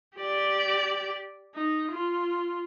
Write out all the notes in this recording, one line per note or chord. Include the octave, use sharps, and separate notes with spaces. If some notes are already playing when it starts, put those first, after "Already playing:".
G4 D5
D#4
F4